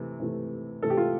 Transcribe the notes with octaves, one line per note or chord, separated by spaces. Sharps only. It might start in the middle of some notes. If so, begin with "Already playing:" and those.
Already playing: C3 E3 A3
C3 E3 A3
C3 E3 A3 A4
G4
F4